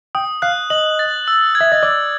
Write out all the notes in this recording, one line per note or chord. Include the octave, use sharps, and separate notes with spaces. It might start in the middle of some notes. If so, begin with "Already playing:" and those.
G5 D#6
F5 F#6
D#5 F#7
A6
E6
G#6
E5
D#5
D5 E6